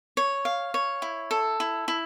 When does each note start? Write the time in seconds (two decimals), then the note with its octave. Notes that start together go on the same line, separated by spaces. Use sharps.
0.17 C#5
0.45 F5
0.74 C#5
1.02 E4
1.31 A4
1.60 E4
1.88 E4